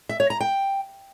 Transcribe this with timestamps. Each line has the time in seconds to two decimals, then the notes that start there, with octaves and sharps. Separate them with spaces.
0.09 E5
0.20 C#5
0.30 A#5
0.40 G5